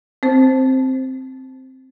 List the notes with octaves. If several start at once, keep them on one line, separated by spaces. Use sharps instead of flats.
C4 C5